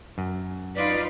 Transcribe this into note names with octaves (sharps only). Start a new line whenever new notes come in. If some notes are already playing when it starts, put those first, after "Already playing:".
F#2
D#4 F4 B4 D5